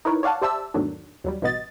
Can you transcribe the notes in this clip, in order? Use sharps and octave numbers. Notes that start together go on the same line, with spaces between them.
D#4 E4 A#4 B4 C#5
C#5 D5 F5 F#5 A5
G4 C5 D5 E5 A5 E6
E2 G#2 D#3 F#3 A3 D4
D#2 F#3 G3
A1 G2 B2 B3 D#5 A6